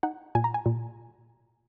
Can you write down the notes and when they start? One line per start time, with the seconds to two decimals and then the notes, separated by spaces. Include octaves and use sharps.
0.03 D#4 F#5
0.35 A#2 G#5
0.44 A#5
0.54 G#5
0.66 A#2